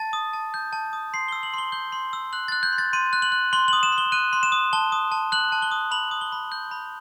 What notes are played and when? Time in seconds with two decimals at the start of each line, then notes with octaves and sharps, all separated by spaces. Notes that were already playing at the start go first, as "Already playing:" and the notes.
Already playing: A5 A6
0.13 D#6
0.33 A5
0.54 G6
0.73 A5
0.93 D#6
1.13 C6 C7
1.28 E6 G7
1.43 F#7
1.54 C6 G7
1.72 G6 G7
1.92 C6
2.13 E6
2.33 F#6 F#7
2.48 F#6 A6
2.63 G6
2.73 C6
2.78 A6
2.93 C6 D#7
3.13 F#6
3.22 F#7
3.32 F#6
3.53 C6 G7
3.68 D#6 F#7
3.83 E7
3.92 C6
3.98 G7
4.12 F#6 D#7
4.33 C6
4.43 E7
4.52 D#6
4.73 A5 G7
4.92 D#6
5.12 A5
5.32 F#6 F#7
5.52 A5
5.62 G7
5.71 D#6
5.91 B5 F#7
6.11 D#6
6.21 G7
6.32 B5
6.52 G6
6.71 B5